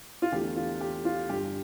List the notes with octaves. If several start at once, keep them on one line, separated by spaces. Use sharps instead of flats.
F4
E2 D3 A3 G4
F4
G4
F4
G2 D3 G3 G4